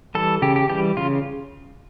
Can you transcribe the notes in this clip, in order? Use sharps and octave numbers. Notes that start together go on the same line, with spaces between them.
E3 G3 A4
C#3 G4
G4
E3 G3 G4
C#3 F4